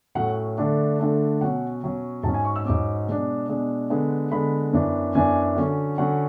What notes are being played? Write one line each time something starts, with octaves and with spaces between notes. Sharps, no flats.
A2 F#3 C#4 F#5
D3 A3 D4
D3 A3 D4
B2 F#3 C#4 F#5
B2 F#3 C#4
G#2 F#3 C#4 A5
G#5
C#6
E6
G#2 F#3 C#4 D6
B2 G#3 D4
B2 G#3 D4
D3 G#3 B3
D3 G#3 B3 B5
F#2 E3 B3 D4
F#2 E3 B3 D4 G#5
D3 F#3 C#4
D3 F#3 C#4 F#5